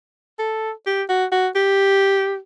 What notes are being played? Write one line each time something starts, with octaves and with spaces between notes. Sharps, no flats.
A4
G4
F#4
F#4
G4